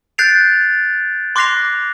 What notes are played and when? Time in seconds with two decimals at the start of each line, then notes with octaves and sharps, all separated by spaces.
0.18 F#6 G6 A6 C7 D7 F7
1.36 C6 D6 F#6 A#6 C7 F7